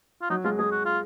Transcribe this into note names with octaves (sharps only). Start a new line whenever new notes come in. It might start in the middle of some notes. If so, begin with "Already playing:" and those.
F4
F#3 D#4
G#3 F4
G#3 G#4
F#4
F4